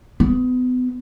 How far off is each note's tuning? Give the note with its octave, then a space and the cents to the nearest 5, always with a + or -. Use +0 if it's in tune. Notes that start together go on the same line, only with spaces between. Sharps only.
B3 +30